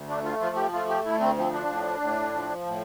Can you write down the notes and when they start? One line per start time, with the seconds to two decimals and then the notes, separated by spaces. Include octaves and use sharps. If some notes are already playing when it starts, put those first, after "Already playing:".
Already playing: D2
0.08 A3 D4
0.24 F4
0.40 F3 F4
0.56 G4
0.73 A3 F4
0.89 G4
1.05 D2 E4
1.20 C4
1.37 F3 C4
1.53 D4
1.69 A2
2.01 A2
2.34 F3
2.67 A2